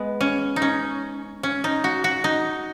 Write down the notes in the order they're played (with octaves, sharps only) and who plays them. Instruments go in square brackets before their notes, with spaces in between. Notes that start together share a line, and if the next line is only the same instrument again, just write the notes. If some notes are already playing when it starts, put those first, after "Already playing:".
Already playing: [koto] G#3 B3
C#4
D#4
C#4
C#4
D#4
F#4
F#4
D#4